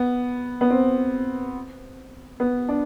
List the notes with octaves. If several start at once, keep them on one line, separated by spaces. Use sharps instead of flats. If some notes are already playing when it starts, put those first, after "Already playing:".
Already playing: B3
B3
C4
B3
D4